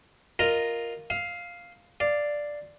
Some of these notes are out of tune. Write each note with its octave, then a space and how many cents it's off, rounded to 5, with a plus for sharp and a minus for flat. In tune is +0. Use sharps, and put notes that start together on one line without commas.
F4 +0 A#4 +0 D#5 -5
F5 +0 D#6 +45
D5 +0 F5 -15